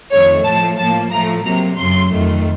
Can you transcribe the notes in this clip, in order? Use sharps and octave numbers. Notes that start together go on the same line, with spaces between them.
F2 D#3 A3 C#5
A2 F3 A3 A5
A2 F3 A#3 A5
A2 F3 A3 A#5
C3 F#3 A#3 A#5
F#2 C#3 F#3 A3 C6
F2 D#3 A3